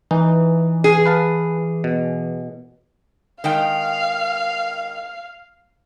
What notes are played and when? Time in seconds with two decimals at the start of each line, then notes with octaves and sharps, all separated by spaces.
0.11 E3 D#4
0.84 G#4
1.06 B4 F5 A5
1.84 B2
3.44 D#3 G#3 F5 G5